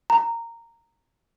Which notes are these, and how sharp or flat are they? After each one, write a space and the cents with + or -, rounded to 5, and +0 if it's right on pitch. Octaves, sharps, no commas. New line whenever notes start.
A#5 -15